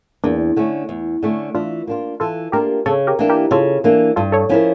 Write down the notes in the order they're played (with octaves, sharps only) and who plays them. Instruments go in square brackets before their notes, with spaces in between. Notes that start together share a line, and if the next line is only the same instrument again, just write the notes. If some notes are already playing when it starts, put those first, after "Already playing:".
[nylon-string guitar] E2 [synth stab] A#3 D4
[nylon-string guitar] D3 A3 C#4
E2
D3 A3 C#4
[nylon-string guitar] E3 [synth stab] D4 F4
[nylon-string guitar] A#3 D4 F4
[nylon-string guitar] E3 [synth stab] F4 A4
[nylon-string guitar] A#3 D4 F4 [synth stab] G4 A#4
[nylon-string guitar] C#3 [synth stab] A4 C#5
[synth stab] G4 A#4
[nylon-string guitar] E3 A#3 D4
[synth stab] G4 A#4
[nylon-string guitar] C#3 [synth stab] F4 A4
[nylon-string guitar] E3 A#3 D4
[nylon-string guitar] G2 [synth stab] F4 A4
[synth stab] A4 C#5
[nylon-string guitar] F3 C#4 E4 A#4